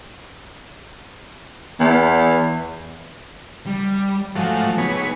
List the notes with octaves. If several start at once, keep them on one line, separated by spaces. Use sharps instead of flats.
E2
G3
G#2 F3 F#3 A3 G#5
B3 D#4 G#4 B4 C#5